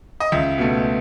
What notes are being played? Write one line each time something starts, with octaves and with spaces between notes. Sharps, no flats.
D#5
C#2 E5
B2 A3